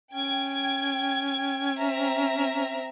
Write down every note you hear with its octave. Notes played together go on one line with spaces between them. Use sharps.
C#4 G5 G#6
C4 E5 A#5